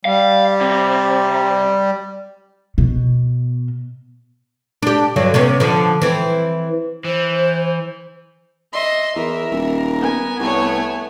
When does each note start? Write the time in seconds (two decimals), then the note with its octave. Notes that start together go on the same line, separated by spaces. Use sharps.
0.05 G3 F5
0.61 C3
2.78 B2
4.82 D4 G4
5.16 G2 D3 F#3
5.34 C3 B3 C#4
5.60 D3 F3
6.02 E3 C4
7.04 E3 C5
8.73 D#5 E5 C6
9.16 E2 A#4 E5
9.51 D#1
10.00 B3 G#5
10.40 C2 A3 C#5